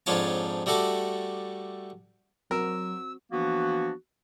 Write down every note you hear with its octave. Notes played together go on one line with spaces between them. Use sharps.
F2 G#2 D4 F4 C#5 A5
G3 A3 F#4 A4 D6
F#3 C4 F#4 A#4 E6
E3 F3 A#3 B3 D4 F#4